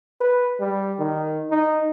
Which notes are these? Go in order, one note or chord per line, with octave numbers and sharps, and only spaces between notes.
B4
G3
D#3
D#4